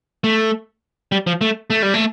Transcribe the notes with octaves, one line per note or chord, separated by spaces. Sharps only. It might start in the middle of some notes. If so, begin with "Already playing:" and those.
A3
G3
F3
A3
A3
G3
A3